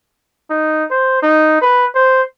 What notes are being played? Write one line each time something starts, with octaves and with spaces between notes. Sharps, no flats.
D#4
C5
D#4
B4
C5